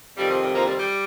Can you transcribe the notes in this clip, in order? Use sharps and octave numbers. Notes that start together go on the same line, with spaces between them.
F2 C3 D#3 G3
F3
G3
F3 A#3
G3 C4
G3